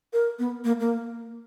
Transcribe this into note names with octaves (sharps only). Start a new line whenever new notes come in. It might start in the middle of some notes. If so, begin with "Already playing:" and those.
A#4
B3
A#3
A#3